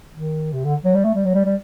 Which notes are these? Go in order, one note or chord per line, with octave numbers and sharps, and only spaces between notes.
D#3
C3
D3
F#3
G3
A3
G3
F#3
G3
G3